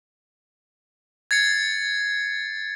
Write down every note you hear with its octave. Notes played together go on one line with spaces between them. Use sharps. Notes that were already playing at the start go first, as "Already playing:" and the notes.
G#6 A6 C7 C#7